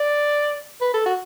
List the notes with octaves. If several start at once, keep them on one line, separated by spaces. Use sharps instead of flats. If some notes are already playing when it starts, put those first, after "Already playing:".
Already playing: D5
B4
A4
F#4